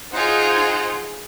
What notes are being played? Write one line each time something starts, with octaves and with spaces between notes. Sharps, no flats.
D#4 F4 G#4 C5 F#5